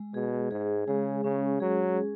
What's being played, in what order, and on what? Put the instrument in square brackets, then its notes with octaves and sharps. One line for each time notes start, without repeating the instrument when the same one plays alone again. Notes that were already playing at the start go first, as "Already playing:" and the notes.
Already playing: [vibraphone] G#3
[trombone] B2 [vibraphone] G#4
[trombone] G#2 [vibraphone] G#4
[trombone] C#3 [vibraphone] G#3
[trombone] C#3 [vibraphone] C#4
[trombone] F#3 [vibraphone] G#4
[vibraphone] G#4